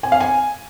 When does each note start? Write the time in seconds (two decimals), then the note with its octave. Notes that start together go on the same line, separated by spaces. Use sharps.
0.03 G#5
0.12 F5
0.21 G#5